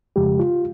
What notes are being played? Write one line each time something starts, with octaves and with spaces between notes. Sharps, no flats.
F2 C#3 F3 G#3 G4
F4